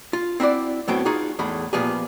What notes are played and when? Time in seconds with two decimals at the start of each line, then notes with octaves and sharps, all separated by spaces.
0.13 F4
0.40 C4 E4 F#4 D5
0.88 A2 F#3 B3 C4 G5
1.06 D#4 F4 F#4 G#4
1.39 E2 A2 G#3 B5
1.73 A#2 F3 B3 G4 G#4